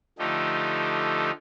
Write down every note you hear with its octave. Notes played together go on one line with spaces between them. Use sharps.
D3 F3 A3 D#4 G4